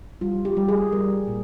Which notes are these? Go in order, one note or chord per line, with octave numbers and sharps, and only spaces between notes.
G3 F4
G4
G3
G#4
G3 A#4
A#2